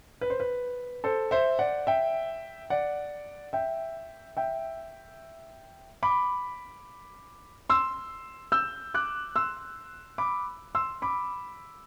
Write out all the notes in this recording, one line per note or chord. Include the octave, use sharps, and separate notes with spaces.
B4
C5
B4
A4 C5
C5 E5
D5 F#5
E5 G5
D5 F#5
E5 G5
E5 G5
B5 D6
C6 E6
E6 G6
D6 F#6
C6 E6
B5 D6
C6 E6
B5 D6